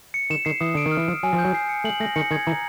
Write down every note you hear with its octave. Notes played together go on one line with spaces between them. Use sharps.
C#7
D#3 E7
D#3 C7
E3 D#6
D3 D7
D#3
F6
E3
F3 E6
F#3 G#5
F3
G6
F#3
C7
C#7
A3 F#7
A3 A#6
D#3 C#7
D#3 G#6
E3 A#5